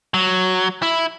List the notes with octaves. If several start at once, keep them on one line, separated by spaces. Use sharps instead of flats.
F#3
E4